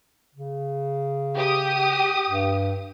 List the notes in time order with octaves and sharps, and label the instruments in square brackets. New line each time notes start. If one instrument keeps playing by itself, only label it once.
[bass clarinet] C#3
[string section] G4 D#6
[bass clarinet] G2